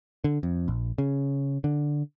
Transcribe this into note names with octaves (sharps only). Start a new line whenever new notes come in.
D3
F2
A#1
C#3
D3